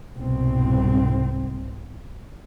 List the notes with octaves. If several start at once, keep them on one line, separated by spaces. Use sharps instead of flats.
C2 G#2 B2 C4